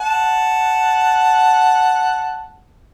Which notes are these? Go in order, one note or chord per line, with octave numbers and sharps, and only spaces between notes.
F#5 A5